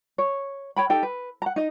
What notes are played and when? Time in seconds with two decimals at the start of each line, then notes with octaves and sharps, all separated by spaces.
0.18 C#5
0.76 C#5 G5 B5
0.90 D#4 G4 A4 G5
1.03 B4
1.42 F#5 A#5
1.56 D#4 D#5